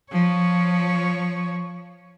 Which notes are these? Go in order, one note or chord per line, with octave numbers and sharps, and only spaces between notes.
F3 C#5